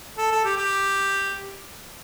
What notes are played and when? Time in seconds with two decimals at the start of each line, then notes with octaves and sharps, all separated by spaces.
0.18 A4
0.31 A4
0.44 G4
0.57 G4